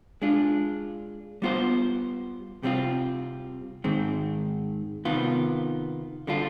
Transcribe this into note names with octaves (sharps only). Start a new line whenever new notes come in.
G#3 D4 F4
G3 B3 F4 C5
C3 G3 C4 F4
G#2 D#3 G#3 C4
C3 D#3 B3 F4
D3 G3 D4 F4